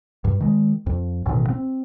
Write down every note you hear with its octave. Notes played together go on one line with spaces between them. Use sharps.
G2
D#3 G3 G#3
F2
A1 B2 D3 D#3
C4